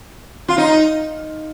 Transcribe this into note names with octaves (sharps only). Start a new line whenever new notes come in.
F4
D#4